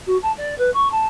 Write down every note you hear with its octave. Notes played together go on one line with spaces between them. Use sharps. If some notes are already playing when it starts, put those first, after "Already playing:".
F#4
A5
D5
B4
C#6
A5